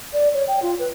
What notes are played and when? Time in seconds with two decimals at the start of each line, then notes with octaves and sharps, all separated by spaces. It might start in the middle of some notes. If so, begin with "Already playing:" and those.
0.13 D5
0.34 C#5
0.48 G5
0.62 F4
0.79 B4